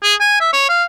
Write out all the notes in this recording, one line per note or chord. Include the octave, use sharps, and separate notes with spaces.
G#4
G#5
E5
C#5
F5